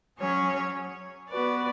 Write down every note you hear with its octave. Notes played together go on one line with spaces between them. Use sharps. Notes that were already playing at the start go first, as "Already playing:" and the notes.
F#3 C#4 G#4 C#5
B3 F#4 B4 D5